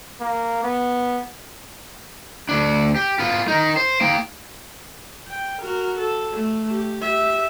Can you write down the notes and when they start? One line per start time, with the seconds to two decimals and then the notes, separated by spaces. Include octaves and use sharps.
0.21 A#3
0.63 B3
2.49 D2 D4
2.96 G4
3.19 B3 F4
3.48 D#4 A#4
3.77 C5
4.01 A#3 G5
5.28 G5
5.62 F#4 A#4
5.99 A4
6.33 A3
6.71 G4
7.02 G4 E5